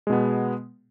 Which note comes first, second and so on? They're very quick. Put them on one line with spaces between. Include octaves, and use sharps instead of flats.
G#3 B2 B3